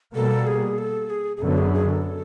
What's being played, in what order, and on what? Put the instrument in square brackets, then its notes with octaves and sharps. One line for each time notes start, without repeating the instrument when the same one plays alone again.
[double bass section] B2 G3 A#3 [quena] A4
[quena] G#4
A4
G#4
G#4
[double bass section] F#2 D3 F#3 B3 [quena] A4
[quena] G#4
G#4
A4